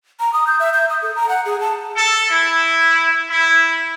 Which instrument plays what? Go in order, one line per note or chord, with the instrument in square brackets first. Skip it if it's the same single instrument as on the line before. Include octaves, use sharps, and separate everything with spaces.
[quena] A#5
D#6
G6
E5
G6
D#6
A4
A#5
F#5
G#4
A5
[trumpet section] A4
E4
E4